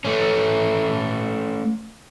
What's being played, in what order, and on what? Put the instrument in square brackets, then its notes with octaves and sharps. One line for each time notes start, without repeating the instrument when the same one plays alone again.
[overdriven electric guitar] A3 C#4